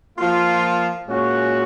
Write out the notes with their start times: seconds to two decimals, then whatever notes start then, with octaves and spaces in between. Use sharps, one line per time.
0.19 F3 A#3 F4
1.07 A#2 G#3 C#4 F#4